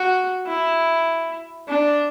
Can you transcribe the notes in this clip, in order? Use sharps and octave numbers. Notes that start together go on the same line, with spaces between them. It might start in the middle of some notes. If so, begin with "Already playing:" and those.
Already playing: F#4
E4
D4